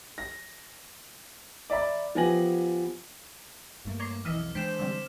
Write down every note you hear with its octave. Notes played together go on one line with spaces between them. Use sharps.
A#6
D5 E5 A#5 B5
F3 B3 G4 G#5 A#6 F#7
G2 A3 A#3
C#5 A#5 C6 D6
B1 F2 E3 D#5 E5 F6
E3 G#3 D4 C5 G5 B6 C7 E7
D3 G3 C4